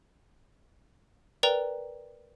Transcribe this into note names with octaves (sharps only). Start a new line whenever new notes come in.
A#4 B4 D5 G5 A#5 F7